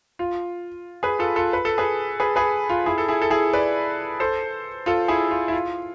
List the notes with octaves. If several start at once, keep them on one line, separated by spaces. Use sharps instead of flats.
F4
G#4 B4
F4 A4
F4 A4
B4
A4
G#4 B4
G#4 B4
G#4 B4
F4
E4 G#4
A4
E4 G#4
A4
E4 G#4
B4 D5
A4 C5
F4 A4
E4 G#4
F4
E4
F4